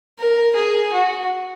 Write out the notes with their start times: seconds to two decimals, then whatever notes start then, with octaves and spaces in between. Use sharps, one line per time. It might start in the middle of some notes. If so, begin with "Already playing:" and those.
0.19 A#4
0.55 G#4
0.93 F#4